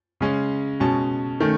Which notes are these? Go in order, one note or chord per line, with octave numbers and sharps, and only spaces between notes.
C#3 G#3 C#4
B2 G#3 C#4 A5
D#3 A3 C#4